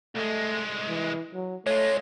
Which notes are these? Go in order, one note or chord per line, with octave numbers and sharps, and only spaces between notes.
C2 G#3 A3
E3
F#3
G#3 A3 F4 C#5